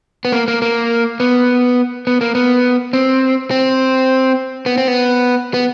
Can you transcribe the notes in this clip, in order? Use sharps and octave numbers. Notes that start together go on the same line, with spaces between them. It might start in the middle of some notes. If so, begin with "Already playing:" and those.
B3
A#3
A#3
A#3
B3
B3
A#3
B3
C4
C4
B3
C4
B3
B3